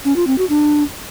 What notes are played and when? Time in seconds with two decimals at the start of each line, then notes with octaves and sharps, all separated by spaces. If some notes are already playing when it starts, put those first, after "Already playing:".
0.05 C#4
0.16 F4
0.27 C4
0.38 F#4
0.49 D4